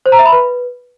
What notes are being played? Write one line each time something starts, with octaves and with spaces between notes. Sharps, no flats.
C5
A#5
E5
B5
B4